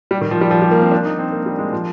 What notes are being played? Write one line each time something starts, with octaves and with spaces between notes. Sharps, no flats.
G3
D#3
F3
G3
F3
G3
A#3
C4
D4
D#4
C4
A#3
G3
G#3
F3